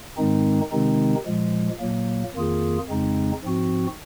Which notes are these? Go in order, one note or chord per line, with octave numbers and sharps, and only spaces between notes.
G#2 D#3 G#3 C4 D#4
C3 D#3 G#3 C4 D#4
A#2 F3 G#3
A#2 F#3 A#3
F2 D#3 A#3 F4 G#4
F2 C#3 G#3 C4 D#4
G#2 F3 C4 F#4